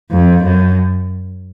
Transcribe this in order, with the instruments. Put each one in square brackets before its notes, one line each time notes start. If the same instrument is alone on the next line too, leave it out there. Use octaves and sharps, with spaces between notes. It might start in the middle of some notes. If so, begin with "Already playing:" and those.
[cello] F2
F#2